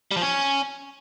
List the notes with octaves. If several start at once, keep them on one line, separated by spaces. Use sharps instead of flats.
G3
F3
C#4